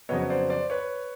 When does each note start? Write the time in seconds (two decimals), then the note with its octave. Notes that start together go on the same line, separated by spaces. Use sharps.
0.09 F2 C#3 F#3 B3 C#5 D#5
0.30 C5 D5
0.49 C5 D5
0.70 B4 C#5